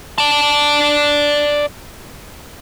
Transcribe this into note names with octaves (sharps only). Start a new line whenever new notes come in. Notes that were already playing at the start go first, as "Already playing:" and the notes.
D5 A5